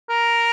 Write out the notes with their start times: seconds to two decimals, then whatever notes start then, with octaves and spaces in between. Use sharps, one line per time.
0.10 A#4